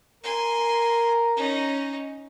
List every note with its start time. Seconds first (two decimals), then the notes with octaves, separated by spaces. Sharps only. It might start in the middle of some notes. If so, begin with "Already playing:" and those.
0.23 A#4 G#5 C6
1.37 C#4 D#4